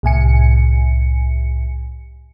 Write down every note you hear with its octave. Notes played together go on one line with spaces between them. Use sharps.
C2 A2 G#5 C#7